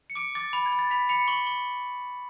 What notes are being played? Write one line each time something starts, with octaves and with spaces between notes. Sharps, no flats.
C#7
D6 D7
D6 A6
B5
G#6
B5
A6
B5 B6
B5 C#7
C#6 F#7
C#6